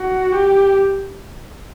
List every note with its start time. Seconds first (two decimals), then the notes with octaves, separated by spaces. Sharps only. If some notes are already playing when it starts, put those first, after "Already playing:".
Already playing: F#4
0.32 G4